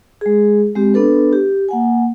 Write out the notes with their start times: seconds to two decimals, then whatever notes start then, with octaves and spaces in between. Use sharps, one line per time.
0.21 G#3 G#4
0.75 G#3 C4 G4
0.94 B3 D4 A4 B4
1.33 G4
1.69 A#3 F#5 G#5